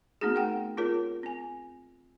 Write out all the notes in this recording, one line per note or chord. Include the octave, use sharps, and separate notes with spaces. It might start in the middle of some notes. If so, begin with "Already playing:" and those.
A3 B3 C4 D#4 F#4 G#4
A#4 F#5 G5
C4 F4 G#4 A#4 C#5
C4 G#5